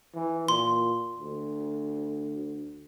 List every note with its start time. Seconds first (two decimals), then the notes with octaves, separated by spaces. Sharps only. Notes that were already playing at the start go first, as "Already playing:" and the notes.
0.14 E3
0.48 A#2 C6
1.19 D2